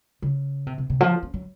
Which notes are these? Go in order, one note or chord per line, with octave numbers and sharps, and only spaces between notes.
C#3
C3
C3
C3
F3
C#4
F#3